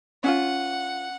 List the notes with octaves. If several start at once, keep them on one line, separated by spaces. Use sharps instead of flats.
C#4 E4 F4 F#5